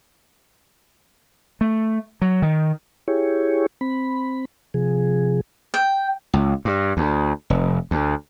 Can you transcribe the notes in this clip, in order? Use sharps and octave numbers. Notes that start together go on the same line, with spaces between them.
A3
F#3
D#3
E4 G4 G#4 C#5
C4 B5
C3 F3 G#4
G5
C#2
G2
D2
F1
D2